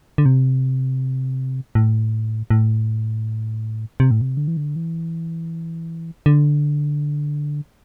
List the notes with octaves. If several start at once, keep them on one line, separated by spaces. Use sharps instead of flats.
D3
C3
A2
A2
C3
A2
C3
D3
E3
D3
E3
D3